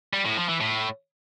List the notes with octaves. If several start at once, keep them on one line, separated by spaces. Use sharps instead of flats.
G3
A2
F3
E3
A2